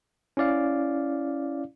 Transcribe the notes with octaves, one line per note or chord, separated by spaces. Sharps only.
C#4 E4 D5 F5